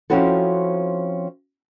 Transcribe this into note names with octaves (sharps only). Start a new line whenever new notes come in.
F3 C4 C#4 E4 F#4 A4